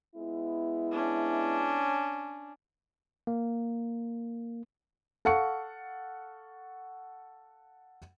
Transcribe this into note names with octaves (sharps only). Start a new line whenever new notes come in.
G#3 B3 E4
C#4 D4
A#3
A4 F5 F#5 C#6 C#7